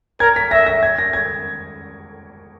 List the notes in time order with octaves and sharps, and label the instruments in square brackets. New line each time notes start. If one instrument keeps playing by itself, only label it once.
[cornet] A#4 [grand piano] G#6
[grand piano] B6
[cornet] E5 [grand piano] A#6
[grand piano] A#6
G#6
A#6
G#6